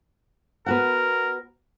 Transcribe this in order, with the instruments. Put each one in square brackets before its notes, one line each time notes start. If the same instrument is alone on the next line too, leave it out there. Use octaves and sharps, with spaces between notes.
[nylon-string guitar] B3 F#4 F#5 [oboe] A#4